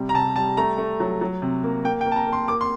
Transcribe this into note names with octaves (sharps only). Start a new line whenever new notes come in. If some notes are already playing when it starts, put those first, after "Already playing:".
Already playing: C3 G3
A#5
C3 A5
G3 A5
A3 A#5
A3
F#3
F#3
C3
A#3
A#3 G5
G5
A#3
A5
A#5
A#3
C6
A#3 D6
C6